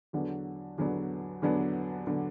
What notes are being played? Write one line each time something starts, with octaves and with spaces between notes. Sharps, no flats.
E2 D3 F#3 B3 D4
E2 D3 F#3 B3 D4
E2 D3 F#3 B3 D4
D3 F#3 B3 D4